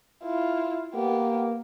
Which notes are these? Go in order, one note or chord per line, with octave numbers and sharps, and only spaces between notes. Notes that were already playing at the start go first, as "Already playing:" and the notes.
E4 F4
A#3 B3 G4